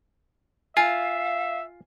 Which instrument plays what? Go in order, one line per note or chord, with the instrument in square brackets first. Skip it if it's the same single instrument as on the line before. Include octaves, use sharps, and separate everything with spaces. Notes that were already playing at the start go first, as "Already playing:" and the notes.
[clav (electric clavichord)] F4 [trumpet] E5 [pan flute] F5 [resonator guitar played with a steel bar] G#5